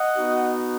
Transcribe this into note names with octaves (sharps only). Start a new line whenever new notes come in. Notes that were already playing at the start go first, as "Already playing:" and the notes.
Already playing: D#5 F#5
B3 D#4 F#4